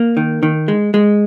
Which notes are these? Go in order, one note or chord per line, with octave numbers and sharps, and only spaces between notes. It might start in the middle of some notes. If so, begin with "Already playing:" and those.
Already playing: A#3
D#3
D#3
G#3
G#3